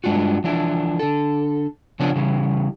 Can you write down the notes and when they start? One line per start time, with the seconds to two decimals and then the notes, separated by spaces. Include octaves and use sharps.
0.04 G2 G#3 D4 F4 F#4
0.44 E3 F3 D4 E4
0.99 D3 A4
2.00 C#3 F3 B3 C#4 D4
2.16 C#3 E3 G3